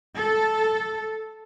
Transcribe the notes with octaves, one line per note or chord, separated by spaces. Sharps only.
A4